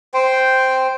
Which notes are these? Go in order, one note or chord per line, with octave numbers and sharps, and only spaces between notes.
C5 G5